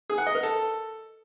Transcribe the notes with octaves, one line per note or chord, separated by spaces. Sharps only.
G#4
F#5
D#5
A#4
A4